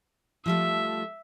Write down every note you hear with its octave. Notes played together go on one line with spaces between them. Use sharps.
F3 G3 A3 E5